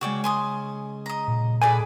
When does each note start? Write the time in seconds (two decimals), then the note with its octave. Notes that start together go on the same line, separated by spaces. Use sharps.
0.01 C#3 G#3 F#4 D5 G5
0.24 G#5 C6 D#6
1.06 D#5 A#5
1.28 A#2
1.62 G#4 A4 B4 D5 G#5 B5